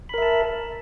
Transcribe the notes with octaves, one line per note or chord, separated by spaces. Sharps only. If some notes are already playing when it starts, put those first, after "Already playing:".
A#4 E5 A5 B5